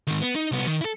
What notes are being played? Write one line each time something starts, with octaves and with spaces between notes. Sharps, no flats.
G#2 D#3
B3
D#4
C2 B3
D#3
E4 A4